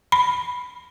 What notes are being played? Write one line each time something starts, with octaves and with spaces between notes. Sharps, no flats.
B5